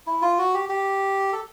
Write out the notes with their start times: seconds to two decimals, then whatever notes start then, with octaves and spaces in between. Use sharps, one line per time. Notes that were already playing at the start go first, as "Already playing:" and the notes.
0.07 E4
0.22 F4
0.39 F#4
0.54 G4
0.69 G4
1.33 A4